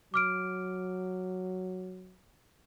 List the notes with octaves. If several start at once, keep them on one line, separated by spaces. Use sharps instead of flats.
F#3 D6 F6 D7